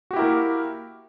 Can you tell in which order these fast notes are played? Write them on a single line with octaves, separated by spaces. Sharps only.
F#4 G4 E4 A#4 A#3